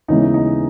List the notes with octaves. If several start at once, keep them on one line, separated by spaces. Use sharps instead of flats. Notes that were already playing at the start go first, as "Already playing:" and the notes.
D#2 C#3 E3 G#3 B3 D#4
D#4